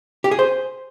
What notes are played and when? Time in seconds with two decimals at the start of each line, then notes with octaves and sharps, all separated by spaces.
0.24 G4
0.31 G#4
0.39 C5